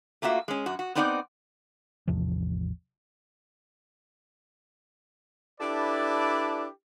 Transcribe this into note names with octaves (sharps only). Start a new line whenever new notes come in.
A3 A#3 F4 F#4 E5
G#3 C#4
F#2 F#4
F#4
B3 C4 D#4 D5 F5 F#5
A1 E2 C3 F3
D4 E4 G4 A4 B4 D5